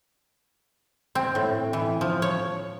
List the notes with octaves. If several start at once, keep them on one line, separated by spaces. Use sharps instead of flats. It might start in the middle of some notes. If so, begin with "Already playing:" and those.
C4
A2
E3
F3
C#5